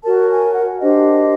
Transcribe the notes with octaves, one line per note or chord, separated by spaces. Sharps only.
F#4 A#4 C#5 A5
G#5
F#5
D4 G4 C5 D#5